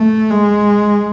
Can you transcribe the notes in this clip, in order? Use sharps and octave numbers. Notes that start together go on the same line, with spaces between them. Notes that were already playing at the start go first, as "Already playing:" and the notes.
Already playing: A3
G#3